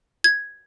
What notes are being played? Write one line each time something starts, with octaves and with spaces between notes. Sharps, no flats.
G#6